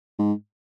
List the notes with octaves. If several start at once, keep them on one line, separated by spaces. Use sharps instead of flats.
G#2